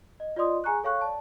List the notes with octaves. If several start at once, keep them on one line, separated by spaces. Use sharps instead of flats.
D#5
F4 D5 D#5 C6 D#6
G#4 G#5 A#5 C#6 F#6
A4 C#5 F5 G5 C#6 F#6
D5 A5